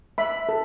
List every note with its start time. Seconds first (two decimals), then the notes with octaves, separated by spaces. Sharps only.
0.18 E5 B5
0.49 A4